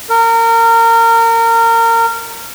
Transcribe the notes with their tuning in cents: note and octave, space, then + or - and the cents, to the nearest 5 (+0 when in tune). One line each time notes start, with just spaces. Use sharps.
A#4 -25